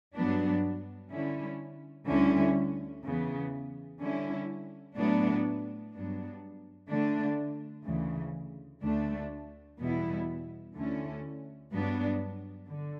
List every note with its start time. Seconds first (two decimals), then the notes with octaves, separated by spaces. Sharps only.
0.14 G2 F#3 B3 D4
1.10 D3 G3 C#4 E4
2.07 D2 D3 G3 C#4 E4
3.04 E2 C#3 E3 B3
4.00 D3 G3 C#4 E4
4.96 A2 F#3 B3 D4
5.93 G2 F#3 B3 D4
6.89 D3 A3 D4
7.85 D2 C#3 E3
8.82 D2 D3 A3 D4
9.79 E2 B2 G3 B3 E4
10.76 D2 D3 A3 C#4 E4
11.72 G2 F#3 B3 D4
12.69 D3